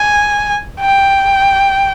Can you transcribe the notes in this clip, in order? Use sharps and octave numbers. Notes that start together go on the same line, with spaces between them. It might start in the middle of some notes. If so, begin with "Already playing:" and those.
Already playing: G#5
G5